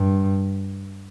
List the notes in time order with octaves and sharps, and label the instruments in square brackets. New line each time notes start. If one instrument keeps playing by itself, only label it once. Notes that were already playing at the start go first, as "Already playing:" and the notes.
Already playing: [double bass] G2